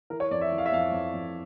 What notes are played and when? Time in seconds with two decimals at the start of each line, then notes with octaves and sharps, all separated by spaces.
0.10 E3 A#4
0.20 C#5
0.31 F2 D5
0.41 E5
0.52 E3
0.58 F5
0.66 E5
0.72 F2 F5
0.92 F2
1.13 F2